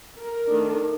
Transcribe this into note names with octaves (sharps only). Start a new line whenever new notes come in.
A#4
D#3 A3 D4